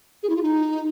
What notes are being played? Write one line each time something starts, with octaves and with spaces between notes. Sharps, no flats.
G#4
E4
F4
D#4